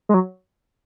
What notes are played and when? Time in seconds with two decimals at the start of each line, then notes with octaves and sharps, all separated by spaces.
0.09 G#3
0.14 F#3